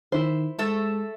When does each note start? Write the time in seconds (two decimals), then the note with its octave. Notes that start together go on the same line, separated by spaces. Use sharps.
0.12 D#3 E4 C5
0.59 G#3 A3 A4 E5